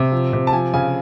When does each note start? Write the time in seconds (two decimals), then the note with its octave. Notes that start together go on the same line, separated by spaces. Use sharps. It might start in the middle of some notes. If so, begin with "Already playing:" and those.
Already playing: C3 E5
0.12 F3
0.33 C3
0.47 A5
0.53 F3 G#5
0.74 C#3 G#5